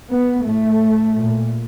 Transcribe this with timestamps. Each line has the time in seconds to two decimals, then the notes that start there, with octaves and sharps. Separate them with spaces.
0.11 B3
0.46 A2 A3
1.16 A#2